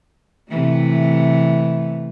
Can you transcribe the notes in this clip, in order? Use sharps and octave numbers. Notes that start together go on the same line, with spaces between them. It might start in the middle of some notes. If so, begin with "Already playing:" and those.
C3 E3 A3